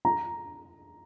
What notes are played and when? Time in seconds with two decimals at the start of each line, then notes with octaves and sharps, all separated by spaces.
0.05 A#5